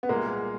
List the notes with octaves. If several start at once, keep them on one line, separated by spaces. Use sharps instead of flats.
B3
C2 A#2 G#3 A#3